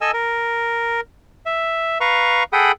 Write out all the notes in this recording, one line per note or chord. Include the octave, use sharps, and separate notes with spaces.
A4 D#5 G#5 E6
A#4
E5
B4 F5 A#5 C#6
G#4 A4 F#5 G5 B5 D#6